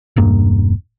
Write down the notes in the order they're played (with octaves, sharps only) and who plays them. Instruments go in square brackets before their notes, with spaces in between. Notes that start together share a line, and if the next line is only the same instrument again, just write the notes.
[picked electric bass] E1 G2 A#3